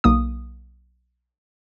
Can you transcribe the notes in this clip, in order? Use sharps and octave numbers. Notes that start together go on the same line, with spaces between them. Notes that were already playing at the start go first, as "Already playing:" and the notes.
B1 A#3 D#6